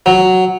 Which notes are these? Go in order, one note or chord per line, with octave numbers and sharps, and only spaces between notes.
F#3